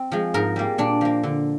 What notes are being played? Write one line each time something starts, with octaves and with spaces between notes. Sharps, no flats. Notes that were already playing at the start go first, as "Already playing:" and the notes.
Already playing: C4
F3 G#3
G#2 A#4
G3 A#3
A#2 D4
F3 A#3
D3